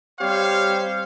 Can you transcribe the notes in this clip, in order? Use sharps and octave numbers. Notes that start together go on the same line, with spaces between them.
G3 C4 G4 C5 C#5 F5